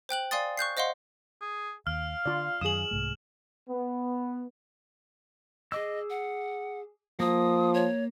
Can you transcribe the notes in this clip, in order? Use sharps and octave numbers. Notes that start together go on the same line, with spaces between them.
C5 G5 F#6 F#7
D5 F5 G#5 C6 D#6 A6
C#6 F#6 G6 C7
C5 D#5 F5 F#5 C6
G#4
D#2 F5 F6
D3 F4 D5
F#2 D#3 G#4 D#6 E7 F#7
C2 G#2 A3
B3
G#4 D#5 D6 E6
F#5
F3 A#3 D#6
C#5